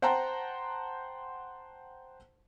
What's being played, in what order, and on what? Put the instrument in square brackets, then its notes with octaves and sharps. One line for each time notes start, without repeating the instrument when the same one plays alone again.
[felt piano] C5 F#5 G5 A5 A#5 C6